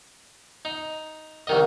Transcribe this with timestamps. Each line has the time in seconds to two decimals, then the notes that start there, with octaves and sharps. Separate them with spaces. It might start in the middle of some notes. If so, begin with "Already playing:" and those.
0.65 D#4
1.47 C2 D#3 D#5